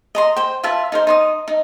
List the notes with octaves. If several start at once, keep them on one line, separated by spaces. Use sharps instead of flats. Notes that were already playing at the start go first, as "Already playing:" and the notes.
D#5 A#5 C6
C5 G5
F4 B4 E5 A5
D#4 A#4 C5
D#4 C6 D#6
D#4